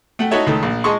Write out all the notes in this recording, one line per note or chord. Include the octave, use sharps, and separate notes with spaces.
A3 F#5 G5
D#4 E4 F#4 A4 C#5 E5
C#2 D#3 A3 A4
A#1
G#3 G#4 D#5 A5 C6 C#6